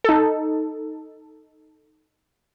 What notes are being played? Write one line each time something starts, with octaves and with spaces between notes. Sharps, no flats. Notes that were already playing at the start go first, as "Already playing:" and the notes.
D#4 A4